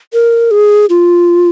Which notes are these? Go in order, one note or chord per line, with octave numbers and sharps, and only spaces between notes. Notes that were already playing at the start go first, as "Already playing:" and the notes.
A#4
G#4
F4